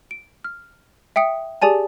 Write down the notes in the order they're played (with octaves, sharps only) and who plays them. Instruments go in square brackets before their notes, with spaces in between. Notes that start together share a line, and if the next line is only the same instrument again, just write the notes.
[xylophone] D7
F6
E5 G5 D#6 C#7
G4 G#4 D5 G#5 A5